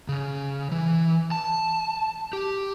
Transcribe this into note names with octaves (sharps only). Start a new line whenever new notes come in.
C#3
E3
A5
G4